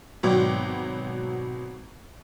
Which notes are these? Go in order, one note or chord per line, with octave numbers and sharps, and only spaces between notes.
G#1 B2 F#3 D5 G5 D6